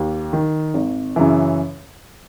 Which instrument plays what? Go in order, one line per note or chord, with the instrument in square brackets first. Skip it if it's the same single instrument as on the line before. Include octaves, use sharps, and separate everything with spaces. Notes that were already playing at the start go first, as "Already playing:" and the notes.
Already playing: [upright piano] D#2
D#3
G#1
F#2 C#3 E3